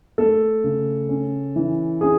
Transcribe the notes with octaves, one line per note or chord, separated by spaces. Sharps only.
A3 A4
C#3
C#4
E3
C#4 G#4